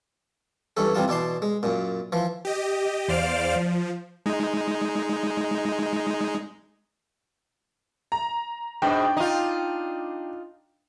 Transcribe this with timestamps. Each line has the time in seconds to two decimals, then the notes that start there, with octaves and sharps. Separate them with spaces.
0.77 G2 E3 C#4 A4
0.95 C3 E3 G3 F4 A5
1.08 B2 E3 D5 A5 C6
1.42 G#3
1.63 F#2 A#2
2.12 E3 F3
2.45 G4 D#5
3.08 E2 C5 D5 F5 F6 D7
3.56 F3
4.26 G#3 D#4
8.12 A#5
8.82 G#2 B2 D4 G5
9.17 D#4 F4